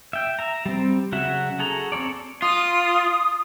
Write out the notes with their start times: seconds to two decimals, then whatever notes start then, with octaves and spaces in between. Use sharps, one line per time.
0.13 E5 G5
0.39 E5 A#5
0.66 G3 C4
1.12 C#3 F#3 F#4 E5
1.59 F#4 G#4 A4 A#5
1.92 C4 A4 C#5 D5
2.42 F4 D#6